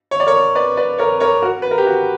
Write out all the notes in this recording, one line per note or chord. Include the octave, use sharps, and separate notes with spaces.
C#5
D5
A#4 C#5
B4 D5
B4 D5
A#4 C#5
A#4 C#5
F#4 A#4
B4
A#4
G4
F#4